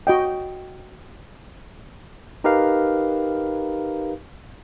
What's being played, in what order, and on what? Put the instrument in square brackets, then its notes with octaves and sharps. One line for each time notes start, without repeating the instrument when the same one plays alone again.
[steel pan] F#4 D#5 G5
[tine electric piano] D#4 G4 A#4 B4 F5